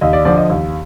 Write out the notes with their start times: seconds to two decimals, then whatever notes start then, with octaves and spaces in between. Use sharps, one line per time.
0.01 D#2 D#5
0.13 D5
0.25 D3 F3 D5
0.37 D#5
0.50 D#2